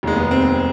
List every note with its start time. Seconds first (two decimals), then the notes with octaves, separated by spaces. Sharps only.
0.03 F1 D#2 D#3 G#3
0.16 B3
0.31 C4